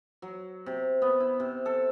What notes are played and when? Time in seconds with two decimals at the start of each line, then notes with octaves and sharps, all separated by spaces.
0.22 F#3
0.66 C3
1.02 B3
1.20 E4
1.40 C3
1.66 A4